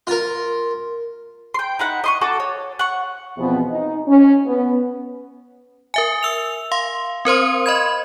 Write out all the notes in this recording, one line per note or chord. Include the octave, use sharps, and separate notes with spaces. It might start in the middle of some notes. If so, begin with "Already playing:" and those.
F4 A#4
G5 C6
D#4 E4 F#5
D#5 C6 C#6
F#4 A4 A5 D6
C#5
F#5 C#6
E2 B2 F3 B3 C4
D#4
C#4
B3
A#4 E5 G#5
E6 F7
F5 C6
C4 A#4 C5 C6
D#5 B5 G#6